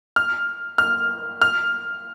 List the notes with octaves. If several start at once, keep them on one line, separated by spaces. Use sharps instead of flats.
F6
F6
F6